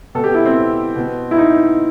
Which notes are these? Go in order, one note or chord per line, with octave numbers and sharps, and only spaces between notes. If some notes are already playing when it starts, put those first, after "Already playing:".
B2 A4
G4
E4
C4
B2
E4
D#4